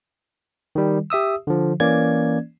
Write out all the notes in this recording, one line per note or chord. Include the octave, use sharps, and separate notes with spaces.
D#3 G3
G4 E5 D#6 E6
D3 F3
E3 A#3 C#4 D5 G#6